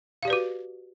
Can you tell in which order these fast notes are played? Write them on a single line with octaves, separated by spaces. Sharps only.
F5 G4 D5 B4 F#4